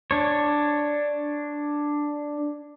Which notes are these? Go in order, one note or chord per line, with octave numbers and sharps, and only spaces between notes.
D4 C#5